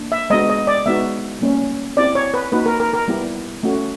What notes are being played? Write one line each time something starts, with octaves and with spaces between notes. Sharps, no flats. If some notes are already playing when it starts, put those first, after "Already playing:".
Already playing: A#3 D4
E5
G#3 B3 D4 F#4 D#5
D#5
D5
G#3 B3 D#4 F#4 E5
G3 A#3 C#4
C4 E4 G4 D5
C#5
B4
A#3 D#4 F#4 B4
A#4
A#4
A#4
G3 B3 E4 G4
A3 C#4 F#4